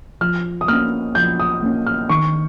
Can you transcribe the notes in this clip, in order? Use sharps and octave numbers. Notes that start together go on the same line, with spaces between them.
F3 F6
D#6
A#3 C#4 F6
F3 G6
D#6
A#3 C#4
F6
D#3 C#6